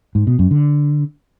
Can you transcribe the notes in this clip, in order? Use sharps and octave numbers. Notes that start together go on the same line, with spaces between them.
G#2
B2
F#2
D3